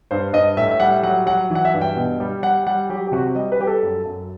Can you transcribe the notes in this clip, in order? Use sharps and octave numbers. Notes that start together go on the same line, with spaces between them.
G2 C5
G2 D#5
A2 E5
E5
G3 F#5
F#3 F#5
F#3 F#5
E3
F#5
E5
G2
G5
B2
G3
G3 F#5
G3 F#5
F#3 G4
G4
C3 F#4
G3 D#5
B4
G3 G4
A4
F#2
F#2